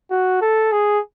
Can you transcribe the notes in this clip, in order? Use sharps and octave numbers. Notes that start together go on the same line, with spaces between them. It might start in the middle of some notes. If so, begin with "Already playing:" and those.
F#4
A4
G#4